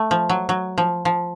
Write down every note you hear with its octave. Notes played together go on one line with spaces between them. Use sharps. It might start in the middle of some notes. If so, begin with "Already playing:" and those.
Already playing: A3
F3
F#3
F#3
F3
F3